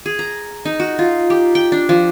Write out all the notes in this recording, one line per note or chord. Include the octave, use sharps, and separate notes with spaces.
G#4
A#5
D#4
F#4
F4
G4
G5
D4
F3